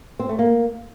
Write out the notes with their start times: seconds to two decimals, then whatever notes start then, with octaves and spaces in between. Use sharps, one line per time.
0.19 C4
0.29 A3
0.39 A#3